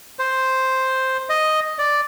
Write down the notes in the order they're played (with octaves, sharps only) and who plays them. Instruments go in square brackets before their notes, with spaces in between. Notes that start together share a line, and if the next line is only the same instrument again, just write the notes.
[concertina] C5
D#5
D5